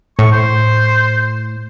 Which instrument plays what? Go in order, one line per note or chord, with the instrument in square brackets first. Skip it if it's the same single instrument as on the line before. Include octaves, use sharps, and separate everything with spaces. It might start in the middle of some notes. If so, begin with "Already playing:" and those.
[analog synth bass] A2 [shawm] C#6
[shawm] C5